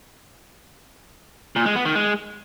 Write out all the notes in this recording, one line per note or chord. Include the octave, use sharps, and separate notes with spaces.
A#2
G#3
B3
D#3
G#3